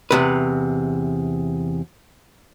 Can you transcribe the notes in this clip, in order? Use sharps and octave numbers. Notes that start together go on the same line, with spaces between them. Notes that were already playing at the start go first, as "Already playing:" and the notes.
E2 C3 B4